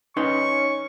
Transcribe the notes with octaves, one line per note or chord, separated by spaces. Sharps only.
C#4 D#4 B4 C6 C#6